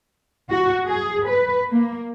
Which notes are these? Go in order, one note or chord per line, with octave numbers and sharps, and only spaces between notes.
F#4
G#4
B4
A#3